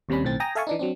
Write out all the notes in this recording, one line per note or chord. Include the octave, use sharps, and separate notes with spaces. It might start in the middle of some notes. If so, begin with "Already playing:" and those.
D#2 C3 G3 C#4 B5
B1 A2 D#3 C4 A6
G5 G#5 A#5 D#6 A#6
A4 E5 F5 G#5 A5 C#6
E3 D4 D#4
F#3 C4 D4